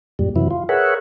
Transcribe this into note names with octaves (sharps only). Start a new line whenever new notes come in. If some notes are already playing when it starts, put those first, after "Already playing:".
F#2 A#2 G3
F#2 C3 E3 F#3 E4
F4
G#4 A#4 B4 C#5 E5 F#5